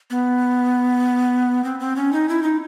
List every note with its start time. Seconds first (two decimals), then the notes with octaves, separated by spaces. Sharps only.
0.10 B3
1.64 C4
1.80 C4
1.96 C#4
2.12 D#4
2.29 E4
2.43 D#4